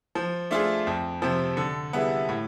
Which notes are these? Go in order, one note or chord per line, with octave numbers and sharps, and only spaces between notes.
F3
A3 D4 F4 G#4
F2
C3 F3
D3
G3 B3 E4 G#4
A2